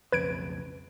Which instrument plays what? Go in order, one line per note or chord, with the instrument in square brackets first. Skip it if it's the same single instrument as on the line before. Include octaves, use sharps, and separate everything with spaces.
[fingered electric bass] B1 F2 C#3 [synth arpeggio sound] B4 G#6 D7